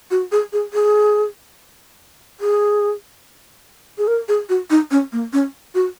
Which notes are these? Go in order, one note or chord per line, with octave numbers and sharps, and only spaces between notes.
F#4
G#4
G#4
G#4
G#4
G#4
A#4
G#4
F#4
D#4
C#4
A#3
C#4
F#4